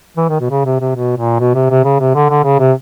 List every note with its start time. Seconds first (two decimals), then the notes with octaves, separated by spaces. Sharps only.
0.17 E3
0.29 D#3
0.40 B2
0.50 C#3
0.65 C3
0.80 C3
0.96 B2
1.17 A#2
1.40 B2
1.54 C3
1.70 C3
1.84 C#3
2.00 C3
2.15 D3
2.29 D3
2.44 C#3
2.59 C3